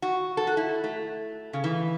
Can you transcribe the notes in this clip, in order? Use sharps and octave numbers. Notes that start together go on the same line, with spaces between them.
F#4
A4
F#4
E4
A3
C#3
E3